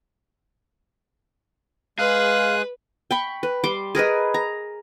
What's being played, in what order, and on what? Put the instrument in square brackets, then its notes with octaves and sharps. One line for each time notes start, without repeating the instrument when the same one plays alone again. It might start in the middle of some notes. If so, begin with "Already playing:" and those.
[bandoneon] G#3 F#6 [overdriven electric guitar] G#4 [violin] B4 [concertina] F5
[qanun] G5 B5 C#6
B4
G3 C6 D6
G#4 A#4 B4 D#5
A#5